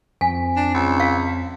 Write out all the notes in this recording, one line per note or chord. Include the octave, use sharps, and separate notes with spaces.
F2 C4 G#5 B6
D4
C#2
F5